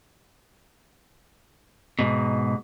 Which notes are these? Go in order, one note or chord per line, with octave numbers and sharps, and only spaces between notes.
G#2 B2